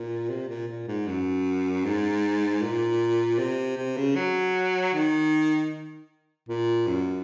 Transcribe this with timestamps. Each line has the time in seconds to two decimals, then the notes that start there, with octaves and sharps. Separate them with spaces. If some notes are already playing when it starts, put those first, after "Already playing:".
Already playing: A#2
0.30 C3
0.49 A#2
0.68 A#2
0.87 G#2
1.07 F#2
1.84 G#2
2.61 A#2
3.39 C3
3.77 C3
3.97 C#3
4.16 F#3
4.94 D#3
6.49 A#2
6.87 F#2